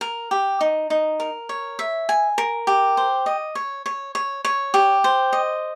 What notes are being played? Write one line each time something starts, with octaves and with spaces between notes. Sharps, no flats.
A#4
G4
D#4
D#4
A#4
C#5
E5
G#5
A#4
G4
C5
D#5
C#5
C#5
C#5
C#5
G4
C5
D#5